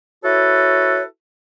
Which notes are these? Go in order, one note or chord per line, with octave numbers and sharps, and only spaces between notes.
E4 F#4 A4 B4 C#5